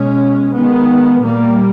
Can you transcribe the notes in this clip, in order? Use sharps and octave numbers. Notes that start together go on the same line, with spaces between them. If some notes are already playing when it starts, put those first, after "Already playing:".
Already playing: B2 G#3 C#4
D#3 G#3 B3
A#2 G3 A#3